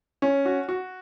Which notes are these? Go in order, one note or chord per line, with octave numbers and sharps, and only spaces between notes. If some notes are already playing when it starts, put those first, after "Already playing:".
C#4
F#4
F#4